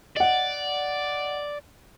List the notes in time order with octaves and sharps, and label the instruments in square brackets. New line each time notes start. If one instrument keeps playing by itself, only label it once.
[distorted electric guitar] D5 [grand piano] D#5 F#5